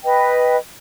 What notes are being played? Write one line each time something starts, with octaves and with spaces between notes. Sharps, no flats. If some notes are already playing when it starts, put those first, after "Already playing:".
B4 D#5 G5